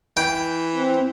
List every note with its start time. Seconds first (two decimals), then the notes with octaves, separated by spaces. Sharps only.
0.17 E3 G5
0.75 C4